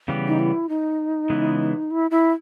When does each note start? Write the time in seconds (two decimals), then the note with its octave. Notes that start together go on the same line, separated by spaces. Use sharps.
0.08 C#3 E3 G3 B3 G4
0.27 D#4
0.39 E4
0.69 D#4
1.30 C#3 E3 G#3 B3 E4
1.91 E4
2.11 E4